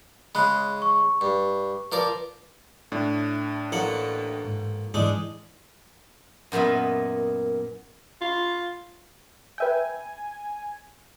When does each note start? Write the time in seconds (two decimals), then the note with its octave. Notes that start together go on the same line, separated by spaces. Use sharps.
0.35 C#3 G#3 B5 F#6
0.82 C#6
1.21 G2
1.92 F3 A#4 B4 D5
2.92 A2 D4
3.72 A1 A#3 F#5
4.45 G#2
4.94 G#2 E3 G#3 D4
6.52 F#2 A#2 B3 E4 D#5
8.21 F4
9.58 B4 E5 G5 G#5